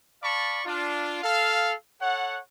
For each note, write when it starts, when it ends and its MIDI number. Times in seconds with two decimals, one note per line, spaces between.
0.23 0.61 74
0.23 0.61 77
0.23 0.61 81
0.23 0.61 83
0.23 0.61 85
0.65 1.19 62
0.65 1.19 65
1.23 1.73 69
1.23 1.73 77
2.01 2.39 69
2.01 2.39 73
2.01 2.39 78